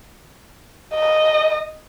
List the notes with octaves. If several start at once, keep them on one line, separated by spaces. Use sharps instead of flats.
D#5